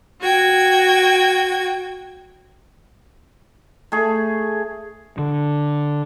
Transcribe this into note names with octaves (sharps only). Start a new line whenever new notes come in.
F#4 G5 G#6
A3 G#4
D3